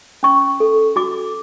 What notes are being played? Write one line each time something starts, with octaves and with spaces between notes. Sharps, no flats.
C#4 C#6
A4
F#4 D6